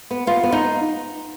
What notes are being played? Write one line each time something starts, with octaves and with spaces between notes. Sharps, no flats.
B3
B3 F4
B3
D#4